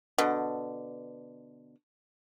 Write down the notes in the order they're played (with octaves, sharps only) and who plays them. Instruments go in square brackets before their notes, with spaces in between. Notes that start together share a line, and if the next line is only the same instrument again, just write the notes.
[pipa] B2 D3